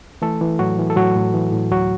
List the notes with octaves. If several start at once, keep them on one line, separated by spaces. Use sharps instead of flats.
E3 A3 A4
E3
A2 F#3 F#4
E3
A4
A2 F#3 F#4
A2
E3
A2
D2 F#3 F#4